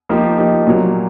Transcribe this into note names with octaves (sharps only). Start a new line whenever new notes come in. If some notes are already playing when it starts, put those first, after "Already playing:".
F3 A#3 D#4 G4
F3 A#3 D#4 G4
A#2 F#3 A#3